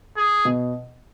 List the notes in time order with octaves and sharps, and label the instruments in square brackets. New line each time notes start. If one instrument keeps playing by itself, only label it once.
[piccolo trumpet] G#4
[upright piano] B2